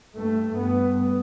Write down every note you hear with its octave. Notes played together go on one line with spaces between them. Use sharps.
G2 A3
G2 B3